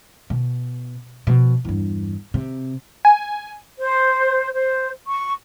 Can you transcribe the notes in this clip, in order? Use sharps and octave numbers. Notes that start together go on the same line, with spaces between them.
B2
B2 F3
E2 G2
C3
G#5
C5
C5
C#6